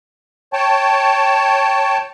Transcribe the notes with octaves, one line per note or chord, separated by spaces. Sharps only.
C#5 G5 A5